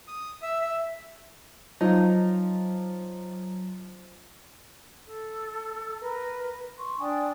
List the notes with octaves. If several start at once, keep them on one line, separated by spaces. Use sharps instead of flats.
D#6
E5
E5
F3 F#3 D#4
A4
A#4 B4 A#5
C6 C#6
D4 G5 G#5 D#6